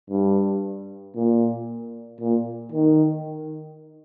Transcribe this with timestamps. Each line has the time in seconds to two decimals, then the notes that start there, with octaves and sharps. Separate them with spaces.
0.10 G2
1.15 A#2
2.20 A#2
2.72 D#3